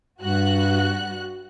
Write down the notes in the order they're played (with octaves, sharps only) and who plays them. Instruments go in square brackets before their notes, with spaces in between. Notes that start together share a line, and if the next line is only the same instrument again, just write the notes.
[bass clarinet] G2 [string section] G3 F#4 F#6